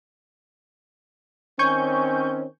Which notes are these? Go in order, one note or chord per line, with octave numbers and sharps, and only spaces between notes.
D#3 C4 C#4 G#5 C#6 G6